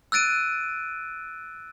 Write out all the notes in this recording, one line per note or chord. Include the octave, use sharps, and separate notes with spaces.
E6 F#6 A6 D7 D#7